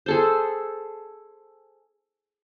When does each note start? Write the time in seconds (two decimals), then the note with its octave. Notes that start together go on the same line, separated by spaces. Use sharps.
0.06 G#4 A4 C5